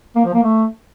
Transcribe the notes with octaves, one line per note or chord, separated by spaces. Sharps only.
A#3
F3
A#3
A3